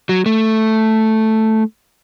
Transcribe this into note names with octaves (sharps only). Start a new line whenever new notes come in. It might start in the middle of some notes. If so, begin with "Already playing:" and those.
F#3
A3